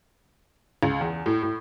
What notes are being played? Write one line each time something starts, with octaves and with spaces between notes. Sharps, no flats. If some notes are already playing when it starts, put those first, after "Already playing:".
C#2
E2
A2
A2